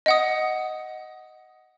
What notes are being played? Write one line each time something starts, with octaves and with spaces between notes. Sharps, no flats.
D#5 F#5 D#6